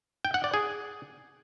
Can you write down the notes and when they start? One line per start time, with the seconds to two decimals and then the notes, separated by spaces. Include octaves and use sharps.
0.25 G5
0.34 F#5
0.44 D5
0.54 G#4